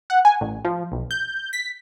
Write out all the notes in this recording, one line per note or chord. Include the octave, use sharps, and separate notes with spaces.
F#5
G#5
A1
F3
B1
G6
B6